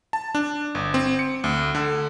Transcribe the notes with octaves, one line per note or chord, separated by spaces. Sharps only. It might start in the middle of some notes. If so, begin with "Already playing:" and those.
A5
D4
G1
C4
C#7
D2
D3